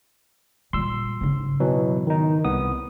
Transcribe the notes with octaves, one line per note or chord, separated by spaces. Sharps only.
A#2 G3 C6 E6
G#2 C#3
B2 E3 F#3
D#3 D#4
C2 B3 D#6